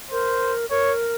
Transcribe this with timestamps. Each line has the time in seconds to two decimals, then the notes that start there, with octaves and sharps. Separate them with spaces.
0.11 A#4 C5
0.71 A#4 C#5